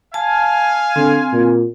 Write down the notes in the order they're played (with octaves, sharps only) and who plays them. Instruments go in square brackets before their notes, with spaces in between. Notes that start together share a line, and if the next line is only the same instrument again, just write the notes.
[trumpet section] F5 G#5 [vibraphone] A5
[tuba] D3 [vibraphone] C4
[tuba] A#2